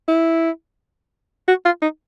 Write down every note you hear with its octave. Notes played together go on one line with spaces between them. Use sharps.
E4
F#4
F4
D#4